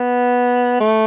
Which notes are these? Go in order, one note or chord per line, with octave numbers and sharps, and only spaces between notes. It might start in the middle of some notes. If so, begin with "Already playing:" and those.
Already playing: B3
A3